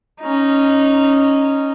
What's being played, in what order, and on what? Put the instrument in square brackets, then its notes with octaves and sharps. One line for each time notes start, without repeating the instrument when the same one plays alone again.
[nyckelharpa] C#4 D#4